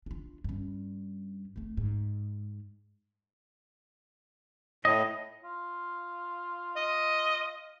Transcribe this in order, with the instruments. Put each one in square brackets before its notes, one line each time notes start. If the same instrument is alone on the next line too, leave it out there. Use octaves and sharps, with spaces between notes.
[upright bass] D4 F4
G2 C#4
F1 A3
G#2
[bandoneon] A2 [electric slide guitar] D#5 [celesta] D#6
[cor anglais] F4
[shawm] D#5